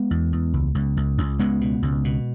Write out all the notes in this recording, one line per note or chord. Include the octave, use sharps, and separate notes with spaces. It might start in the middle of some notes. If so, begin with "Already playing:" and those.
Already playing: G#3 B3
E2
E2
C#2
C#2
C#2
C#2
C#2 G#3 B3
B2
C#2
B2